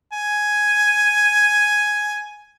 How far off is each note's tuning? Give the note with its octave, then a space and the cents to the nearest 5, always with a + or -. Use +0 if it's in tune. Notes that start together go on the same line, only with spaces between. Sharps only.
G#5 +5